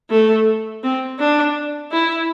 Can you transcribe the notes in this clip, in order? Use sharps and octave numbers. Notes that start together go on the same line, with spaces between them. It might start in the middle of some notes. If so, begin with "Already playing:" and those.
A3
C4
D4
E4